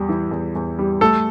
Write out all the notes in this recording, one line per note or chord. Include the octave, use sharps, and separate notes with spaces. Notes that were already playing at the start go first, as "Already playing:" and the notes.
Already playing: E2 G3
E3
E2
E2
G3
A3 A4